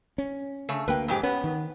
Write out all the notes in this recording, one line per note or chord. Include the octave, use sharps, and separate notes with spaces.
C#4
C#3 A3
D2 A#3 B4 G5
F2 G#2 G4
B3 C#4
D#3